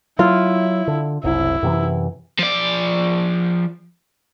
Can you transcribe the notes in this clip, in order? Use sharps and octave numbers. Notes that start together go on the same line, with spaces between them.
F#3 E4 F4
D3
F#1 C2 E4
F#2 C3 E3
F3 D5